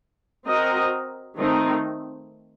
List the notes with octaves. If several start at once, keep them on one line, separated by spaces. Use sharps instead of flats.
C4 F#4 A#4 D#5
D#3 A3 C4 D#4